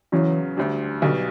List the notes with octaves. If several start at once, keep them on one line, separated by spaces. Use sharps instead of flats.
E2 C#3 E3 F#3 C#4
D2 D3 G3
B1 B2 D3 G3